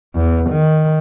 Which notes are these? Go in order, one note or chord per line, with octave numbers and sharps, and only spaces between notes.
E2
D#3